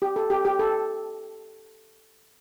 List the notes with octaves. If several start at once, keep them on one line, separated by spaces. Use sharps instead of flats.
G4
A4
G4
G4
A4